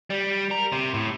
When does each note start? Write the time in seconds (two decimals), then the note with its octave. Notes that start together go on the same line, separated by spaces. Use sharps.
0.10 G3
0.51 A#4
0.72 C3
0.94 A2